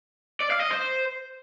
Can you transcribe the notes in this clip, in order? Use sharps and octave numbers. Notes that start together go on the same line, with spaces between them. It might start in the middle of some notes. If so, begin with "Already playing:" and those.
D5
F5
D#5
C5